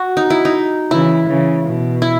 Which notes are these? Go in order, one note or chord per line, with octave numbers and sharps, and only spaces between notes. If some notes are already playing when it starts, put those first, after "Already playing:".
Already playing: F#4
D#4
E4
D#4
C#3 E3 E4
C#3 E3
B2
E4